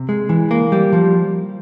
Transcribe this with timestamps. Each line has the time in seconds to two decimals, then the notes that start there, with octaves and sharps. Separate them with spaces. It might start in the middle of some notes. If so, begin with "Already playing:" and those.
Already playing: C3
0.09 G#3
0.29 E3
0.51 A#3
0.72 G3
0.93 F3